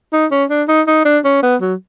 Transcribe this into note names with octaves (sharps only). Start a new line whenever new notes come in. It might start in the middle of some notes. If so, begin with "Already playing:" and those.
D#4
C#4
D4
D#4
D#4
D4
C#4
B3
F#3